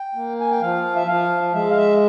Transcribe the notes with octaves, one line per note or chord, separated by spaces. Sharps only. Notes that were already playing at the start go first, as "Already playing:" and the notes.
Already playing: G5
A#3
G#5
G5
F3 F5
E5
F3 F5
G#3 E5
F5
E5